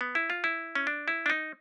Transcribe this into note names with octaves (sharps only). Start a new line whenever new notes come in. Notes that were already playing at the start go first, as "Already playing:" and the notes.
B3
E4
F4
E4
C#4
D4
E4
D4
D#4